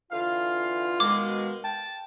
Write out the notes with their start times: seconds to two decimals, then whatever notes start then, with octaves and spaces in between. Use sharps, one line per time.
0.12 D3 E3 F4 F5
1.00 B2 D#3 G#3 D6
1.64 G5 A5